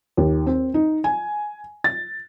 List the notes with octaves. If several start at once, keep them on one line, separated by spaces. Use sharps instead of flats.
D#2
C4
D#4
G#5
A6